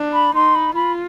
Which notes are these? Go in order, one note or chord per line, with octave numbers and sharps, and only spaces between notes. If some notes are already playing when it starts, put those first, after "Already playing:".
Already playing: D4
B5
D#4 C6
B5
F4 B5